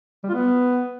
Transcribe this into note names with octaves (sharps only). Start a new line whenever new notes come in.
G3
F4
B3